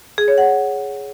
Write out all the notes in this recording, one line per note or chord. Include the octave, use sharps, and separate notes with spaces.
G#4
C#5
F#5